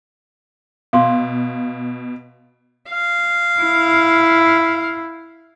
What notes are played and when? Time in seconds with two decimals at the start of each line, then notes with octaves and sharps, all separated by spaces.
0.93 B2 F5 C6 D6
2.89 F5
3.61 E4